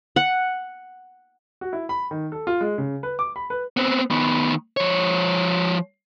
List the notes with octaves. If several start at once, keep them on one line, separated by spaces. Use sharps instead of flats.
F#5
F#4
E4
B5
D#3
A4
F4
G#3
C#3
B4
D6
B5
B4
B3 C4
D#3 B3
F3 C#5